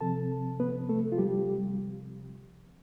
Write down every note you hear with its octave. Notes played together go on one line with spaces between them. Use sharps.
C3 F3 C4 A4 A5
B3 B4
A3 A4
F4
G3 G4